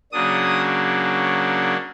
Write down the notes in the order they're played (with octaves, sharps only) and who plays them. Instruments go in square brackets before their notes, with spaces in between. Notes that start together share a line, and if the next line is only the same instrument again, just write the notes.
[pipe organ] C#3 F#3 A#3 D4 D#6